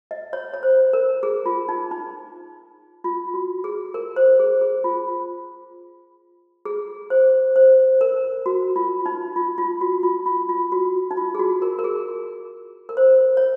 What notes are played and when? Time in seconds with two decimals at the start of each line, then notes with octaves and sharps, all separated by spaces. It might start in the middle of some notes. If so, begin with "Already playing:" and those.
0.11 D#5
0.33 C#5
0.54 C#5
0.63 C5
0.93 A#4
1.23 G#4
1.46 F4
1.69 D#4
1.91 D#4
3.04 F4
3.34 F#4
3.64 G#4
3.94 A#4
4.16 C5
4.39 G#4
4.61 G#4
4.84 F4
6.65 G#4
7.10 C5
7.56 C5
8.01 A#4
8.46 F#4
8.76 F4
9.06 D#4
9.36 F4
9.58 F4
9.81 F#4
10.03 F4
10.26 F4
10.49 F4
10.72 F#4
11.11 D#4
11.17 F4
11.35 G#4
11.39 F#4
11.62 A#4
11.79 A#4
11.84 G#4
12.89 A#4
12.97 C5
13.37 C#5